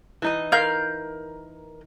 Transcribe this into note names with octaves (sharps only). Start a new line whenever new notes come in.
E3 D#4 D#5
A#4 F5 G6